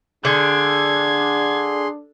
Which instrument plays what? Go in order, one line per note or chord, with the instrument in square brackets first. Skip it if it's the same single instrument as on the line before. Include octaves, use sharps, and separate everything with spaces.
[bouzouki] D3 [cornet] D4 [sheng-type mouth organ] G#4 C6 [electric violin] G#6